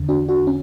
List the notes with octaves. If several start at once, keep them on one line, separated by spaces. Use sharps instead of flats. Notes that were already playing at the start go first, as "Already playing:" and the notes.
Already playing: E2 D3
D4 F#4
D4 F#4
C#4